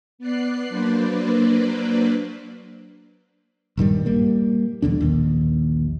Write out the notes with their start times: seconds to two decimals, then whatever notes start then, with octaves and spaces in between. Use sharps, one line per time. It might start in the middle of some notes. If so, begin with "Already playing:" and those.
0.19 B3 D5 F#6 C7
0.69 F#3 A#3 D4 B4 C5 D5
3.77 A#1 G2 D#3 G3
4.06 G3 A#3
4.82 B1 E2 D3 D4
5.01 A#1 D#2